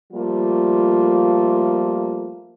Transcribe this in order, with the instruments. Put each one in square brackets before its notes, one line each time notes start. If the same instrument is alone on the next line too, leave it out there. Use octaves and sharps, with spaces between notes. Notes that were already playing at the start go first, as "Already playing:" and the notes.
[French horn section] F3 G3 A3 A#3 F4